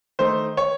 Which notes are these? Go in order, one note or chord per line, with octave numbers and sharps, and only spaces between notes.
D#3 A3 D#4 C5
C#5